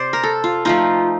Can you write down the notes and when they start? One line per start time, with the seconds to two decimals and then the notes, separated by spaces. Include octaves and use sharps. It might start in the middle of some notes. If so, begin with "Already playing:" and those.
Already playing: C3 C5 D5
0.13 A#4
0.23 A4
0.44 F4
0.65 F3 A3 D#4 F4